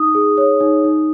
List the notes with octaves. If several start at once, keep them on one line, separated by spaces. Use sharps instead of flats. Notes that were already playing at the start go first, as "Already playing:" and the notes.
Already playing: D#4 D#6
G#4
C#5
D#4
D#4